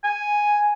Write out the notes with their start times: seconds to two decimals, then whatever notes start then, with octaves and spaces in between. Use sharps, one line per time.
0.04 G#5